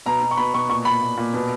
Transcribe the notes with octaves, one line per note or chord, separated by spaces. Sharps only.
B2 A#5
B2
C#6
B2 B5
B2 C#6
A#2 C#6
A#2 B5
A#2
A#2
B2